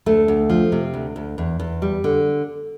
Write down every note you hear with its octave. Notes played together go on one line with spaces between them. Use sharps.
D2 A3
D2
F3
C3
D2
D2
E2
E2
G3
D3